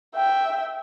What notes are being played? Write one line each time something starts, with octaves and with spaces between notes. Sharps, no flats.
E5 G5